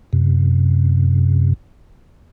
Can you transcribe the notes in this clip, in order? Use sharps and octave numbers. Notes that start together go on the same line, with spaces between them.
F#2 C3